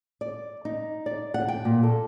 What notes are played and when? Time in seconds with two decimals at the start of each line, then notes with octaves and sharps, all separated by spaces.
0.21 D5
0.65 D#4
1.06 D5
1.34 F#5
1.48 G5
1.65 A#2
1.83 A4